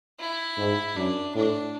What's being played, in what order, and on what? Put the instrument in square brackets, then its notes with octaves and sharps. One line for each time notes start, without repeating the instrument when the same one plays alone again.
[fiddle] E4
[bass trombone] G#2
[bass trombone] F#2 [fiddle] D4
[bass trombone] A2 [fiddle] D4